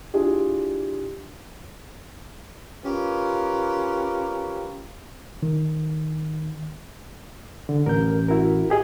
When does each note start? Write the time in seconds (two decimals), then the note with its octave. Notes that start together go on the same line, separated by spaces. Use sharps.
0.14 D4 E4 F4 G4 G#4
2.84 C#4 F4 G4 A#4 B4
5.43 D#3
7.69 D3
7.86 A1 A#4 G6
8.28 E4 F#4 A#4
8.70 G4 G#4 D#5